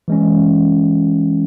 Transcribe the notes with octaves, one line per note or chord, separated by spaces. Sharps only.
E3 G#3 C#4